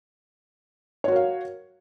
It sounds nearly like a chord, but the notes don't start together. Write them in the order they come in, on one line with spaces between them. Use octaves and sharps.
C#5 F#4 A#4 F5